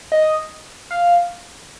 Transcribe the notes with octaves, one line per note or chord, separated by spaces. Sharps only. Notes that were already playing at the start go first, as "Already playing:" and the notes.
D#5
F5